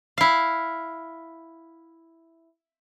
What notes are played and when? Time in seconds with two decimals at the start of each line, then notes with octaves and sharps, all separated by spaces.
0.18 E4 F5